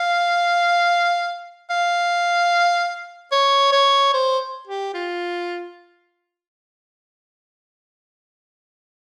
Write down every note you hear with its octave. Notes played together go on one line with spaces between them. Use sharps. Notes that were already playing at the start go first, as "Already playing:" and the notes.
Already playing: F5
F5
C#5
C#5
C5
G4
F4